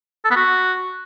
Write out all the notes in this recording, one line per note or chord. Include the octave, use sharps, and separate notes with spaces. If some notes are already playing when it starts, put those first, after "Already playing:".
A4
B3
F#4